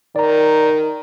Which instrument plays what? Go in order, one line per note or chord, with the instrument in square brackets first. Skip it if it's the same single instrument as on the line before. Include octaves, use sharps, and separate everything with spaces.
[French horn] D#3 [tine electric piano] D5 A#5